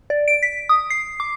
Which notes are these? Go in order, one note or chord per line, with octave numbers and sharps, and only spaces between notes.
D5
D7
B6
D#6
C7
D6